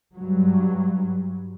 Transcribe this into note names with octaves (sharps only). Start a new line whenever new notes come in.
G2 F#3